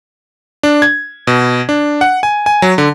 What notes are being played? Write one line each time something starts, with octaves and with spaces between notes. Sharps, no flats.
D4
G#6
B2
D4
F#5
G#5
G#5
F#3
D3